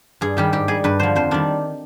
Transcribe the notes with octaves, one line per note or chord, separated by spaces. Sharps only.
G2 G#4
D#3 G3 G4
G#2 G4
G3 G#4
G2 B4
D3 F3 C5
F2 C5
D#3 G3 D4